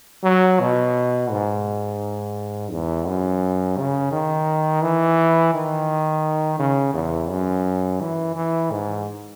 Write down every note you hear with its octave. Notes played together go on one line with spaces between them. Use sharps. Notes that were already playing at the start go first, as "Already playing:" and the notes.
F#3
B2
G#2
E2
F#2
C#3
D#3
E3
D#3
C#3
E2
F#2
E3
E3
G#2